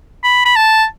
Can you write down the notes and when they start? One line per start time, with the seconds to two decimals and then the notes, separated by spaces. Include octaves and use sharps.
0.23 B5
0.45 B5
0.56 A5